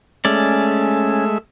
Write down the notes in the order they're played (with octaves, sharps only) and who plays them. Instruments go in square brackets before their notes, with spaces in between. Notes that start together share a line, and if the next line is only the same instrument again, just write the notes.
[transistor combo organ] G#3 A3 E5 [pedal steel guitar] C#4 D5